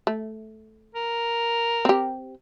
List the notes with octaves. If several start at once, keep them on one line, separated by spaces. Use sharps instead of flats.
A3
A#4
C4 G4